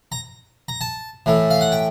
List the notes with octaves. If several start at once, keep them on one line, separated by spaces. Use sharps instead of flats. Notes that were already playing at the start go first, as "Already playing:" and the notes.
A#5
A#5
A5
A2 E3 A3
F5
F#5
G5